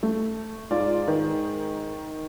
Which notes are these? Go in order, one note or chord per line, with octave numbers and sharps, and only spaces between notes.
A3
G#2 F4 D5
D#3